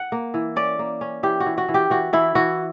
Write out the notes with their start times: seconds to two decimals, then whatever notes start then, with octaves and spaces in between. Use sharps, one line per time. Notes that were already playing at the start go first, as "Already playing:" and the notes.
Already playing: F#5
0.12 A#3
0.34 E3
0.56 C#4 D5
0.79 A#3
1.01 C#4
1.23 E3 G4
1.40 F#4
1.46 E3
1.58 F#4
1.68 E3
1.74 G4
1.90 E3 F#4
2.13 E3 E4
2.35 E3 F#4